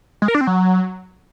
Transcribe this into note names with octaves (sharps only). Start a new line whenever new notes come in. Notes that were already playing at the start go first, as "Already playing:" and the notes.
G#3
A#4
D4
C4
F#3